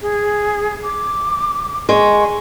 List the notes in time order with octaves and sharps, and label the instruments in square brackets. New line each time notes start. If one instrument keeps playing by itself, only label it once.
[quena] G#4
D6
[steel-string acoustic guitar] G#3 [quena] C#6